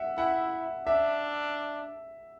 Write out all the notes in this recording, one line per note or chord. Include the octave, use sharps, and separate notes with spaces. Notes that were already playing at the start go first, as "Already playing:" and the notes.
Already playing: E5 F#5
E4 F#5
D4 E5